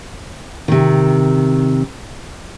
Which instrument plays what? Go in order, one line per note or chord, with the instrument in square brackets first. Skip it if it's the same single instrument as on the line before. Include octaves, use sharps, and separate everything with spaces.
[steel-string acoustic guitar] C3 D#3